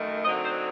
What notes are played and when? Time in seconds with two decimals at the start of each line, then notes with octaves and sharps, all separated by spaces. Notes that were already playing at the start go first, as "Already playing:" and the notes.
Already playing: F#2 D#3 A3
0.25 D3 F#3 C4 D#4 D#5
0.43 C5